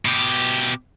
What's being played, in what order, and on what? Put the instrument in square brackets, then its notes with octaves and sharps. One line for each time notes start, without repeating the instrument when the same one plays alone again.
[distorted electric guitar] B2 G4